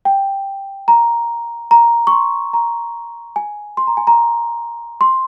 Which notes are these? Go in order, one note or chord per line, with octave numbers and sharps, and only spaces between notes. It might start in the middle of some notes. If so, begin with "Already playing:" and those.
G5
A#5
A#5
C#6
C6
A#5
G#5
C6
A#5
G#5
A#5
C6